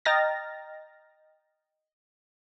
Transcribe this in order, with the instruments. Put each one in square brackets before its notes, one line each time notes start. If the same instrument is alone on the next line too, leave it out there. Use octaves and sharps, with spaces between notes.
[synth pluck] D#5 G5 A#5 F6 A6 A#6